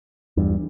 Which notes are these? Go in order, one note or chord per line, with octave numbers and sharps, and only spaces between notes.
E2 G2